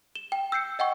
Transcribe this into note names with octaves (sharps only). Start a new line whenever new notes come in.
E7 G7
G5
E6 G6 C7 C#7
D#5 F#5 G5 C#6